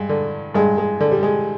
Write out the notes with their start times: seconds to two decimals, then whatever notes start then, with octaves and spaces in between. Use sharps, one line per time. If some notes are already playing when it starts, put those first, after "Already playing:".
Already playing: G2 G#3
0.09 D3
0.54 G2 G#3
0.78 G#3
1.00 D3
1.12 G3
1.23 G#3